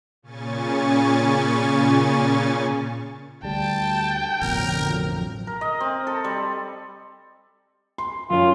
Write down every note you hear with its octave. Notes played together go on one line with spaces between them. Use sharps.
A#2 C#3 C#4 G#5 C#6 A6
D2 G3 G5 A5
A1 F2 B2 D3 F3 F#3 A#4
A#4
D#5
C4
A4
G3
C6
F#2 C#4 F4